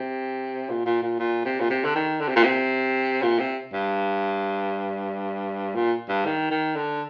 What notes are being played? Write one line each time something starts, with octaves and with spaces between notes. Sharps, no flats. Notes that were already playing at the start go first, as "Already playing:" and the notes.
Already playing: C3
A#2
A#2
A#2
A#2
C3
A#2
C3
D3
D#3
D3
C3
A#2
C3
A#2
C3
G2
A#2
G2
D#3
D#3
D3